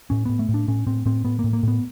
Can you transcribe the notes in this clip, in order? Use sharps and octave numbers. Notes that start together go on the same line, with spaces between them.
A2 C#4
A2 B3
A3
A2
D4
A2 C#4
A2 C4
A2 C4
A2 B3
A#3
A2
A#3
A2 B3